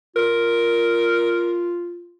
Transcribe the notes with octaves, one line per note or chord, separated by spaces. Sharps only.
F4 A#4